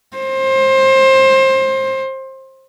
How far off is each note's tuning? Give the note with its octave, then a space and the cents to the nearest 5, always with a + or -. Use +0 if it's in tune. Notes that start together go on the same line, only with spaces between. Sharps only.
C5 +25